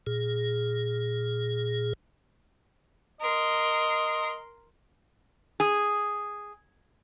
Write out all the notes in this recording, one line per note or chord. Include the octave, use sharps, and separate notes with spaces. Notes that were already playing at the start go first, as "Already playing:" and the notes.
A#2 G#4
A#4 D#5 C6
G#4